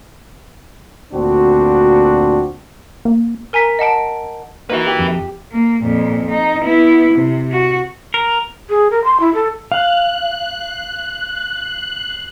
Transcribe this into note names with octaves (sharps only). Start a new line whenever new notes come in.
D2 A#2 C4 D4 F#4
A#3
A#4 G#5 A#5 B6
D#5 F#5 A5 D7
A#3 D#4 F#4 B4 E5
G4
F2
A#3
F2 A#2
D#4
B3 E4
C3
F#4
A#4
G#4
A#4
C6
E4
A4
F5 F#6